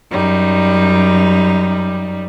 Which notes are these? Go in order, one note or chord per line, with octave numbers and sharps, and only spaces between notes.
F#2 G3 D#4